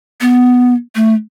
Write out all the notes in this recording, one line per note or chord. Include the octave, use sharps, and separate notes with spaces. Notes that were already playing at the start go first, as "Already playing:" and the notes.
B3
A3